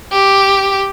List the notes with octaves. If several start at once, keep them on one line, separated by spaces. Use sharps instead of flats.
G4